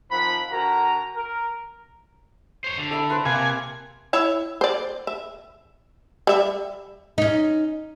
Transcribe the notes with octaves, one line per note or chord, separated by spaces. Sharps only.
D#3 F3 C4 F#5 B5
D3 F#4 A#4 G#5 A#5
A#4
C5 C#5
D3
A4 E5 B5
B4 C5
C3 A#3 G#5
E4 C#5 E5
C5 D5
E5
G3 E5
C#4 D#4